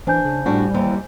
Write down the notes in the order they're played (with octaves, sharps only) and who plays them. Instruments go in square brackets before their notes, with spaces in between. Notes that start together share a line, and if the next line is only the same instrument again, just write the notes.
[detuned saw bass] E3 [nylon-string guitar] D4 [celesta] C5 G#5 G6
[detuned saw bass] C#3
[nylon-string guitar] A2 D4 F#4 [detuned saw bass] G3
[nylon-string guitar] D#2 E3 C4